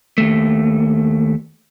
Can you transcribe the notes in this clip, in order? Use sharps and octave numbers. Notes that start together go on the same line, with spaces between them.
D#2 A3